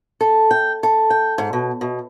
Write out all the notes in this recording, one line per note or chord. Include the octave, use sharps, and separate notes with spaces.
A4
G5
A4
G5
G#2
B2
B2